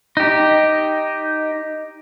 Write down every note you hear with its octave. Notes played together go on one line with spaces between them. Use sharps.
D#4 G4